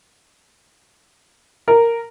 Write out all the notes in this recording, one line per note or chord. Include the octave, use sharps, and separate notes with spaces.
A#4